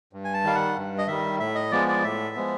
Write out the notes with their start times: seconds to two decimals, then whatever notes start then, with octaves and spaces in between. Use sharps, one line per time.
0.13 G2
0.24 G#5
0.34 A5
0.44 D#3 G3 F5
0.55 F#5
0.77 G2
0.98 D#5
1.07 D#3 G3 E5
1.39 A2 E5
1.55 D#5
1.71 F3 G#3 B3 D5
1.88 D5
2.03 A2 E5
2.35 F3 G#3 B3